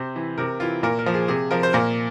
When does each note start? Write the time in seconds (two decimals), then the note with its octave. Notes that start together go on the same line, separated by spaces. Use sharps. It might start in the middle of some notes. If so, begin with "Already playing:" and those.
Already playing: C3 C5
0.16 E3
0.38 C3 A#4
0.60 E3 F4
0.83 A#2 A#4
0.99 A#4
1.06 F3
1.14 G#4
1.28 C3 G#4
1.51 F3 A#4
1.63 C5
1.73 A#2 A#4